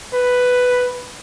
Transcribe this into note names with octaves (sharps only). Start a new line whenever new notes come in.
B4